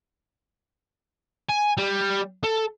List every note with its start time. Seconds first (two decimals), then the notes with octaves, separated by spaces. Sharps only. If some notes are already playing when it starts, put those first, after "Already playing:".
1.50 G#5
1.77 G3
2.43 A4